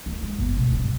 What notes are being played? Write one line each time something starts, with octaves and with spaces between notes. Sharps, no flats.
D2 D#3
G#3
G1 B3
D2 B2
D1 C#4
G2 C#3